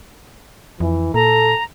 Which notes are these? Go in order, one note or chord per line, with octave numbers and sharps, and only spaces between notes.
F2 E3
A#2 A4 A#5